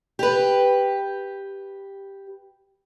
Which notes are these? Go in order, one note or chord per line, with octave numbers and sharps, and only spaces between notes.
G4 B4